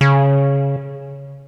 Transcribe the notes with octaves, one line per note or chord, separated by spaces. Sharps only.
C#3